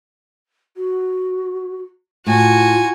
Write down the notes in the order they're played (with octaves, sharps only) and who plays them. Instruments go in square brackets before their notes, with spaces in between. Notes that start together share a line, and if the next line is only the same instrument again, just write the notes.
[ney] F#4
[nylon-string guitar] A2 [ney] F4 [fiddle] F#4 G#5